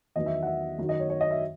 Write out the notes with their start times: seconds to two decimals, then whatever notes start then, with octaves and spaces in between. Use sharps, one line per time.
0.16 E2 D#3 F#3 B3 D#5
0.26 E5
0.43 F#5
0.47 E5
0.78 F#2 D#3 F#3
0.89 D#5
1.00 C#5
1.10 C#5
1.21 D#5
1.31 E5